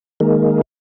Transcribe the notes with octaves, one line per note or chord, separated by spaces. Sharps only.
D#3 G#3 A#3